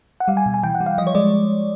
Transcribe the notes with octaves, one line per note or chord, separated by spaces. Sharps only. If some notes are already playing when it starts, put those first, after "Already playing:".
F#5
G3 F5
G#5
B2
G#5
E3 G5
F#5
G3
F5
F3 D#5
C#5
G#3 D5